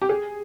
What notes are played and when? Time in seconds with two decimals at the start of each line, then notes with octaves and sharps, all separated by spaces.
0.02 G4
0.09 G#4